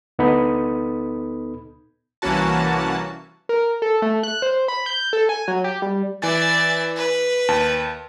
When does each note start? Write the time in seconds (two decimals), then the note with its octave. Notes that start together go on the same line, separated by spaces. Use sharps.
0.19 D2 B3 D#4 A4 B5 D#6
2.22 C2 E3 A#3 C#4 F#4 A5
3.49 A#4
3.82 A4
4.02 A3
4.23 F#6
4.42 C5
4.68 B5
4.86 G6
5.13 A4
5.29 G#5
5.48 F#3
5.64 G4
5.82 G3
6.22 E3 D5 E5 G#5 A6
6.96 B4
7.48 D#2 A5